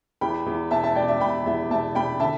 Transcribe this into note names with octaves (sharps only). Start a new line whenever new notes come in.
E2 G5 B5
E2
B2 E5 A5
E5 A5
B2 D5 G5
E5
B2 G5 B5
E2 E5
B2 E5 A5
B2 G5 B5
D3 E5 A5